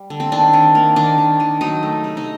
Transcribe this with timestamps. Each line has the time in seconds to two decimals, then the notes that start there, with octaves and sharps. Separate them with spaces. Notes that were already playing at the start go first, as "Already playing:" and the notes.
Already playing: G3
0.10 D3
0.20 C4
0.32 D#3 D4
0.53 D#3
0.75 A#3
0.96 D#3 D4
1.18 D#3
1.40 D#3
1.61 F#3 D#4
1.83 A3
2.04 C3
2.17 D#4